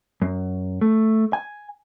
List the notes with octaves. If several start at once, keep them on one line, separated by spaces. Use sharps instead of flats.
F#2
A3
G#5